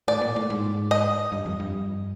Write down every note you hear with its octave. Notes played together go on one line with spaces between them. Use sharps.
A2 D5
A#2
A2
G#2
D#5
G2
F2
G2